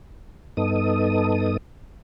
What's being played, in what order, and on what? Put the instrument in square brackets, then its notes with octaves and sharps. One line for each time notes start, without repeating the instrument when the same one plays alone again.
[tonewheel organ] G2 B3 D#4 A4 D#6